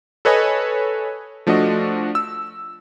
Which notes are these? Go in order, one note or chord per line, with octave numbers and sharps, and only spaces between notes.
A4 B4 C#5 D#5 G#5 B5
F3 A3 D4 F#4 D#5
E6